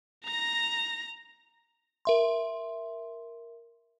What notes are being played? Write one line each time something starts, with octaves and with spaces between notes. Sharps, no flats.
A#5 A#6
A#4 E5 C6